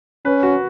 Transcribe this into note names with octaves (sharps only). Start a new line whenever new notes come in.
C#4 B4
F#4